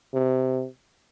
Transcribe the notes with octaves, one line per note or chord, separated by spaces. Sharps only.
C3